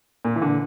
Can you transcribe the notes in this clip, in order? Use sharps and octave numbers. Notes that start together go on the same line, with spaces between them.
A#2
E3
D3